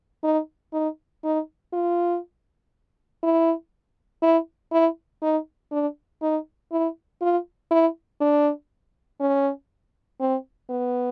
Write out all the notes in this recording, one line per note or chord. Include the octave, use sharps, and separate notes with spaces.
D#4
D#4
D#4
F4
E4
E4
E4
D#4
D4
D#4
E4
F4
E4
D4
C#4
C4
B3